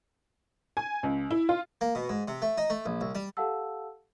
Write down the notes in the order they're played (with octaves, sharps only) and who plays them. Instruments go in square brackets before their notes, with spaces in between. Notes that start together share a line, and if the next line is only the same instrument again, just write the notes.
[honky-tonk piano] G#5
C#2
E4
F4
[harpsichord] A#3
B2
G#2
C3
A3
D#4
A3
A#1
C2
G3
[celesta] G4 A4 F5 F#5 A5 E6